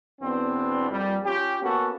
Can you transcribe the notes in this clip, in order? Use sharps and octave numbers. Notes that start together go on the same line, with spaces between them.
E2 B2 B3 C4 D4
F2 A#2 G3
C#4 F4 G4
A#3 B3 C#4 F#4 A4